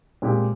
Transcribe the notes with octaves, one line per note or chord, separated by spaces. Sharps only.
A#2 G#3 C4 G4